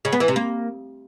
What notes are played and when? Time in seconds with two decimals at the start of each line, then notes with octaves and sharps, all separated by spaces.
0.05 C#3
0.13 B3
0.20 E3
0.28 C3
0.36 A#3